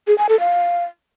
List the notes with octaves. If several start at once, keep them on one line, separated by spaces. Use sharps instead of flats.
G#4
G#5
A4
F5